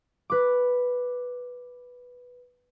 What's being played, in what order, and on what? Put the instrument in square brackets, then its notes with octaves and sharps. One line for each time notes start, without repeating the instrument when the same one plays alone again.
[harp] B4 D6